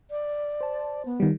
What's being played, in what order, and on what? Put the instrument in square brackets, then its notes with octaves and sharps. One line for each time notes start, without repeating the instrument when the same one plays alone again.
[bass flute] D5
[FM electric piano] C5 A5
[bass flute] B3
[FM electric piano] D#3 G3